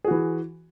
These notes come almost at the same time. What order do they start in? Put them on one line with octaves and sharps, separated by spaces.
G#4 F#4 E3